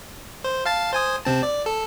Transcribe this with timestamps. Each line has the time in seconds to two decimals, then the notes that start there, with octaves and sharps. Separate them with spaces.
0.44 C5
0.66 F5 A5 A6
0.93 C5 G#5 D#6
1.25 C3 C4 A5
1.43 D5
1.66 A4